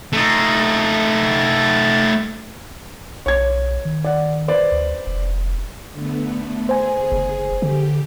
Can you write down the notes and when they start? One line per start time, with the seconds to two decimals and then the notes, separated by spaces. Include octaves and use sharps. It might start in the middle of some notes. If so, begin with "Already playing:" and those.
0.13 A3 D#4
3.26 B1 C#5 G#6
3.85 D#3
4.04 D5 F#5
4.48 B4 C5 D5
4.72 D2
5.07 F1
5.93 D3 A3 B3
6.69 G#4 C5 G#5
7.12 F#1
7.62 D3 G4